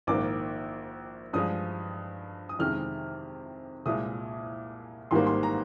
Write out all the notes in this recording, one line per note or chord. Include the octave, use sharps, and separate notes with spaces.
A#1 G#2 D#3 A#3 D6
G2 F3 G#3 D#6
D#6
F2 C3 D#3 G#3 F6
C2 A#2 G#3 D#6
G#1 G#2 D#3 G3 A#3 C6
C6
A#5